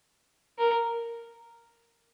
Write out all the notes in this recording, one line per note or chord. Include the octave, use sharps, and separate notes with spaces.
A#4